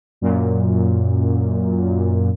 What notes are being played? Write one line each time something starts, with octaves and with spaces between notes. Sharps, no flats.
F#2 A#2